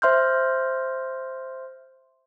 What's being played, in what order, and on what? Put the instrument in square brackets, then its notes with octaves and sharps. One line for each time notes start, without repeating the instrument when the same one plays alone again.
[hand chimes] C5 E5 C6 F6 G6